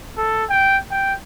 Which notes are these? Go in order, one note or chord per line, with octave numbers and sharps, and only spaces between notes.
A4
G5
G5